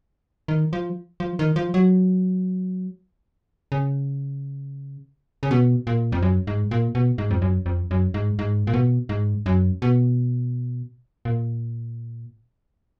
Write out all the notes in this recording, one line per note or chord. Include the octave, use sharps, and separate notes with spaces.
D#3
F3
F3
D#3
F3
F#3
C#3
C#3
B2
A#2
F2
F#2
G#2
A#2
B2
G#2
F2
F#2
F2
F#2
G#2
G#2
A#2
B2
G#2
F#2
B2
A#2